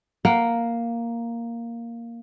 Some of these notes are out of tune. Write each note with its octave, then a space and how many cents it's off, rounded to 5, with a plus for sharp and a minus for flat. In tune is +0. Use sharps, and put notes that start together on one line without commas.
A#3 +0 F#5 +5